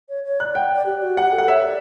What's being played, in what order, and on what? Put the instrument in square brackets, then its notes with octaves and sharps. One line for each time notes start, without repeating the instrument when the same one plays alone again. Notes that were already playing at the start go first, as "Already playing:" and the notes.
[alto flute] C#5
C#5
[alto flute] D5 [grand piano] F#6
[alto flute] F#5 [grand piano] G5
[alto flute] D5
G4
F#4
[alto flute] G4 [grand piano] F#5
[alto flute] A4
[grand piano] F#5
[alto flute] C#5 [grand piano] E5
[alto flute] D5